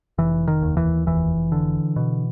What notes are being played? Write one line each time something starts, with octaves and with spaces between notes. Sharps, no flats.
F1 E3
D#3
D#2
E3
F1 E3
D3
B2